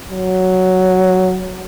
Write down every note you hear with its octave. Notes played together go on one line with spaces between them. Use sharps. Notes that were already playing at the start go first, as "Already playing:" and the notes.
F#3